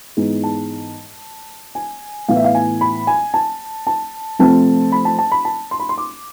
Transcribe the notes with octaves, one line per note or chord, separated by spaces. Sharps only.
G#2 E3 G#3 B3
A5
G#5
A2 E3 B3 F5
E5
F5
G#5
B5
G#5
A5
A5
C3 F3 A3 C4 A5
B5
A5
A5
B5
A5
C6
B5
C6
D6